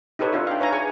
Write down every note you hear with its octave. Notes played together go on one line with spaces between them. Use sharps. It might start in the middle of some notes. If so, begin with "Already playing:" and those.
D#4 G4 A4 B4 C#5
D4 F4 E5
F5 G5
B4 C#5 G#5 A#5
G#4 G#5 C#6